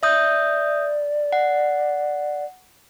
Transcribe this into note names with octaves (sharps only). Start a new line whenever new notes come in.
D5 E5 D#6 G6
F#5